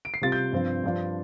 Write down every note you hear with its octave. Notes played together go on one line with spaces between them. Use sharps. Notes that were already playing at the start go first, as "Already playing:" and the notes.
D7
C7
C3 G3 F4 A6
G6
G2 F3 C4 F4
G2 F3 D4 F4